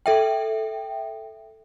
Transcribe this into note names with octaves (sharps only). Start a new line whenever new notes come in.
A4 E5 G5